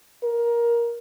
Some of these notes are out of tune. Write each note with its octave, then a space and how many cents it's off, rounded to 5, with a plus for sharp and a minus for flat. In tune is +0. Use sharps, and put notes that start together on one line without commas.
A#4 +15